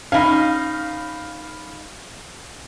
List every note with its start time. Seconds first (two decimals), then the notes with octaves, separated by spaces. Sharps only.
0.12 C#4 D#4 F5 B5